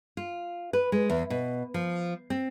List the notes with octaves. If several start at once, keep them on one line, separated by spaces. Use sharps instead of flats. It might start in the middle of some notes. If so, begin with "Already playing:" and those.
F4
B4
G#3
E2
B2
F3
C4